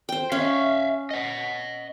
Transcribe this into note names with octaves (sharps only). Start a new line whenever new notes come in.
C5 G5
C#4 E5 F5
D#5 F#5